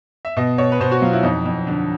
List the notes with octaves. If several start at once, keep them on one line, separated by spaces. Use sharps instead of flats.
E5
B2 D#5
B2 C#5
B4
B2 C5
F#4
F#3 F4
E4
F2 D#4
F2
D3